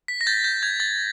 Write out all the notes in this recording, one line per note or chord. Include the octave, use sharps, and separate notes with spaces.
B6
A#6
G6 A6
G6
G6 G#6
A6